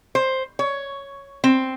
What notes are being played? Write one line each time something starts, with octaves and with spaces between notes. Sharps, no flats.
C5
C#5
C4